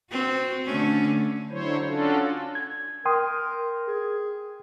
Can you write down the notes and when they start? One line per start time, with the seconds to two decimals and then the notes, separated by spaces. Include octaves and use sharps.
0.10 C4 F#4
0.65 D3 A3 C#4
1.50 D3 F#3 E4 C5 C#5
1.88 C#4 D4 F4 F#4 A4
2.55 G#6
3.05 A#4 G5 C6 D#6
3.88 G#4